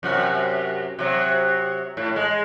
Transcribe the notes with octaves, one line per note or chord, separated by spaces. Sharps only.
F#2 C3 F#4
C3 F#3
A2
G#3